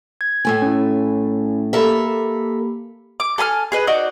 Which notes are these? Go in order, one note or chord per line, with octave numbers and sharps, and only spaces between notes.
G#6
A2 A3 G#5
C#4 E4
A#3 G4 A4 A#4 E5 B5
D6
A4 G#5 C6 F6
G#4 B4 D#5
D#4 F#4 D5